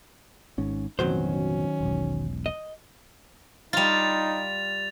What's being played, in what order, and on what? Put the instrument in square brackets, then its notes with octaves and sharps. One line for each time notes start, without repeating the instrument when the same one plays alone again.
[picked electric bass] G#1 G#2 C#4
[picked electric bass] A1 F2 B2 [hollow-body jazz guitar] D#3 F#3 C5 [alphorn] C#4
[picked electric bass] E1 B1
[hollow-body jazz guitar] D#5
[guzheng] G3 F4 [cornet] D#4 [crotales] A6 F7